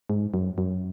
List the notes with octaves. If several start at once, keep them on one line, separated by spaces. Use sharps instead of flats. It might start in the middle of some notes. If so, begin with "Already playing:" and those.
G#2
F#2
F#2